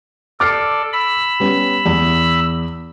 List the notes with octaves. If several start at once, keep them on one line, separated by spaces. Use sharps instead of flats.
A4 D5 D6 F6 C7
B5 E6
G3 B3 C#4
E2